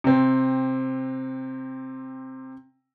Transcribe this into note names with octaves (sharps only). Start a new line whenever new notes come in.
C3 C4